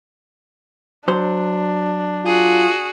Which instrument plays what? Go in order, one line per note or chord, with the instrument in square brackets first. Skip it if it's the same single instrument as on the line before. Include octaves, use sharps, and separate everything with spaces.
[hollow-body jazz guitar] F#3 C5 [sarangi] D4
[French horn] F4 [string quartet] F#4 G#4